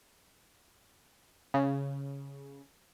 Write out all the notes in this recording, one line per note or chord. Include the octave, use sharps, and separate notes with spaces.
C#3